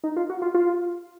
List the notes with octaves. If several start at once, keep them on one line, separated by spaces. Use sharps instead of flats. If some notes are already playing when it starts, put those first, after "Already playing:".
D#4
F4
F#4
F4
F4